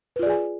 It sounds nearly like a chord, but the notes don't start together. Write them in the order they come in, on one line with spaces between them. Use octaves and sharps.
B4 F4 D5 G#4 G#5